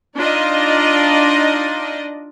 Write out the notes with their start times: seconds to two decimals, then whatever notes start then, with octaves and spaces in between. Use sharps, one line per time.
0.16 D4 D#4 F4 D5 D#5